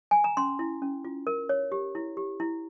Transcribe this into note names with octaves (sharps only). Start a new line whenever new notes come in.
G#5
A#5
C#4 C6
E4
C#4
F4
A#4
C#5
G4
E4
G4
E4